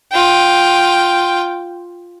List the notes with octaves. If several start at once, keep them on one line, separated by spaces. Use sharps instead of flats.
F4 G5